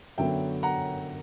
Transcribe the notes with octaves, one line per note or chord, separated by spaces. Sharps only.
F#2 D3 F#3 B3 E5 G5
F#5 A#5